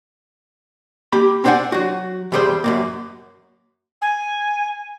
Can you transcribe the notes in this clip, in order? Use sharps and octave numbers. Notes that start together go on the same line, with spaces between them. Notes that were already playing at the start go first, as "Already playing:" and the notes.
A#3 G4 B5
C4 D4 C5 D5 F#5 G#5
F#3 F#4
E2 G2 G3 G#4 C5 C6
F#2 A#2 A#3
G#5